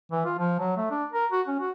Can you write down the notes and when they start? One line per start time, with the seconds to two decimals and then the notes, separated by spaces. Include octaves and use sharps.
0.12 E3
0.25 F4
0.39 F3
0.59 F#3
0.77 A3
0.90 D4
1.12 A#4
1.32 F#4
1.48 C#4
1.59 F#4